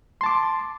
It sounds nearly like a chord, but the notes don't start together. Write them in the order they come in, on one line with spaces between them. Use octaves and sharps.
C6 A5 D6